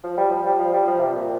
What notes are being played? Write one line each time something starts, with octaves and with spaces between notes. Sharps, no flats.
F3
G3
F3
G3
F3
G3
F3
C3
A#2